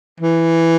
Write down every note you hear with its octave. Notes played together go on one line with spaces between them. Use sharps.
E3